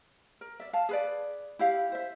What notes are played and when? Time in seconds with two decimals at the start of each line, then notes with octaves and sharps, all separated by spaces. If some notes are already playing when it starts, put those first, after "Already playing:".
0.41 A#4
0.60 D5 E5
0.73 F5 A5
0.89 G#4 B4 D5
1.59 E4 G4 F5
1.92 C5 E5